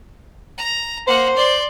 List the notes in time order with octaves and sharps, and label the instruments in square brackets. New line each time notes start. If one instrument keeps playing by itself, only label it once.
[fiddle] A#5
[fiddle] A#3 F#5 [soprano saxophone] C5
[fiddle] D5 C6